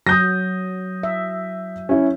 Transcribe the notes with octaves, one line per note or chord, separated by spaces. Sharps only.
F#3 D#6 G6 A#6
E5
C#4 E4